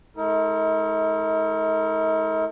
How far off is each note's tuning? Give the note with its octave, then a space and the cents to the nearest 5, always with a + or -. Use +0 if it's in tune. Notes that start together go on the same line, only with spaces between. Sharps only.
G#3 +35 D#4 +45 A#4 -30